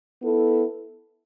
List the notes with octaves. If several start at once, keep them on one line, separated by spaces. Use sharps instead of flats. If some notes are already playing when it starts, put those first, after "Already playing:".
B3 E4 A4